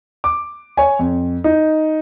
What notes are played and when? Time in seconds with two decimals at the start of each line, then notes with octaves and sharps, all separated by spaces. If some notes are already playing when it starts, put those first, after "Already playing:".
0.24 D6
0.77 C#5 G#5
0.99 F2
1.44 D#4